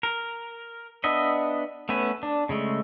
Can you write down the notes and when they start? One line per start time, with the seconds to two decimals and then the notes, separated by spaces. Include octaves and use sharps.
0.03 A#4
1.04 B3 D4 D#5 E5
1.89 A3 B3 C#4 B4
2.23 D4
2.49 C#3 G#3 A3